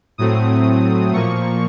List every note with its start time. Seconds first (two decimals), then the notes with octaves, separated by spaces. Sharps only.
0.18 A2 F#3 A3 C4 D#6
1.13 A#2 F3 A#3 C#6